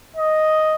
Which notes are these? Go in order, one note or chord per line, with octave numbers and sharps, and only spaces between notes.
D#5